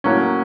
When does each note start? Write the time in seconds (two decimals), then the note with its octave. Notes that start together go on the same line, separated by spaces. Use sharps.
0.04 A2 F#3 A#3 C#4